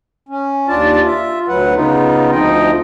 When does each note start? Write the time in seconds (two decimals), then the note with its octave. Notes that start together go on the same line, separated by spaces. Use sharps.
0.29 C#4
0.68 D#2 D4 F4 D5 A5
1.06 F4 E5
1.48 D2 F#3 B4 F#5
1.75 C#3 B3 D#4 F4
2.32 D2 F3 C4 D#4 D#5 G5